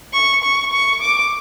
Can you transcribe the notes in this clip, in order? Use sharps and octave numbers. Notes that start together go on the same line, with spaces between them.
C#6
C#6
C#6
D6